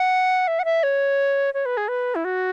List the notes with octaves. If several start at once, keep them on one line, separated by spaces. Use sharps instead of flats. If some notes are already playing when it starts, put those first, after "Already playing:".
Already playing: F#5
E5
F#5
E5
C#5
C#5
B4
G#4
B4
E4
F#4